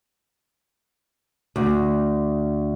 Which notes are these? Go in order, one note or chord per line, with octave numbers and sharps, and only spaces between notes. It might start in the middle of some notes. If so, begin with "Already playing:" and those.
D2